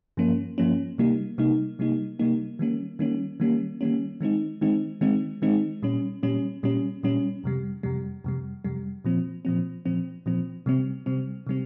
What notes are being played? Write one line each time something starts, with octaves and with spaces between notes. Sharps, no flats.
G2 F3 A#3 C#4
G2 F3 A#3 C#4
C3 G3 A#3 D#4
C3 G3 A#3 D#4
C3 G3 A#3 D#4
C3 G3 A#3 D#4
D#3 G3 A#3 C#4
D#3 G3 A#3 C#4
D#3 G3 A#3 C#4
D#3 G3 A#3 C#4
D#3 G#3 C4 D#4
D#3 G#3 C4 D#4
D#3 G#3 C4 D#4
D#3 G#3 C4 D#4
A#2 G3 C#4
A#2 G3 C#4
A#2 G3 C#4
A#2 G3 C#4
F2 C3 G3
F2 C3 G3
F2 C3 G3
F2 C3 G3
A#2 F3 C4
A#2 F3 C4
A#2 F3 C4
A#2 F3 C4
C3 G3 C4
C3 G3 C4
C3 G3 C4